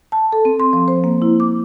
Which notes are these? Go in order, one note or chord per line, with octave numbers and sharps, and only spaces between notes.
A5
A4
C4
C6
F3
C5
A#3
E4
D6